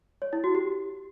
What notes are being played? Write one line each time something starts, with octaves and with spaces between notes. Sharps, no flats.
C#5
E4
F#4
G4